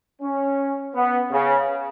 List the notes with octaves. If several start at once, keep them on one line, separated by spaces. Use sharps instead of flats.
C#4
B3
C#3